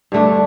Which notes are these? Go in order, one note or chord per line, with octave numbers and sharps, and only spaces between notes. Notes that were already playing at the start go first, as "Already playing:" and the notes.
G2 D3 A3 D4